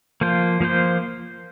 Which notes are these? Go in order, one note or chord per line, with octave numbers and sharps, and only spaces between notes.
F3 A#3 F4 C5
F3 A#3 F4 C5